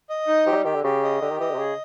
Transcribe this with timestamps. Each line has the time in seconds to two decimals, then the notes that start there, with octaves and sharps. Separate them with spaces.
0.10 D#5
0.27 D#4
0.46 F3 G4
0.52 F#3
0.56 G3
0.65 D#3 G4
0.75 D3
0.84 C#3 G4
1.03 D#5
1.21 D3 G4
1.31 D#3
1.40 E3 D#5
1.49 D3
1.54 C3
1.58 C#3 G#4